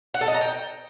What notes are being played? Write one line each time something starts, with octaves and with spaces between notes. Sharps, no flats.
F#5
A4
D#5
A#5
G5